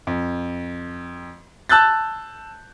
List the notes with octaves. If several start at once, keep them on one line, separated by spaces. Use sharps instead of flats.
F2
A5 E6 F#6 G6 A6